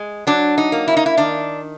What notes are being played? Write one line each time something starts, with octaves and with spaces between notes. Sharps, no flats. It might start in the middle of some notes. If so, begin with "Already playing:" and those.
Already playing: G#3
F#3 D4
D#4
A#3
E4
D#4
E4
D#3 D4